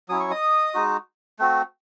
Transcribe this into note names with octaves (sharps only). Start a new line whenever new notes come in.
F#3 C#4 E4 D#6
C#6
D#5 D#6
G#3 D#4 F#4
A3 C4 F#4